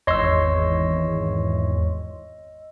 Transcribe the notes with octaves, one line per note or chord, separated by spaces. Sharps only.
G#1 E2 C#5 D#5 C6 E6